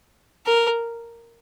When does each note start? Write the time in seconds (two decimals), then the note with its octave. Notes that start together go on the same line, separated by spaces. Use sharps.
0.46 A#4